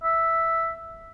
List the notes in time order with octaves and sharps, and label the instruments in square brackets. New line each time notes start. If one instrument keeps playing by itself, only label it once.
[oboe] E5